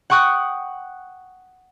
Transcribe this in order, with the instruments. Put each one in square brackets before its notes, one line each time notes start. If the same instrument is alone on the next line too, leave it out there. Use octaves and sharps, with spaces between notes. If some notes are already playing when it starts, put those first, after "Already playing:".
[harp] F#5 G5 C#6 D#6 F#6